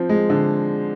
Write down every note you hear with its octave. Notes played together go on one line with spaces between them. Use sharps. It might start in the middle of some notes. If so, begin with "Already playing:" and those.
Already playing: F3 C4
G#3
D3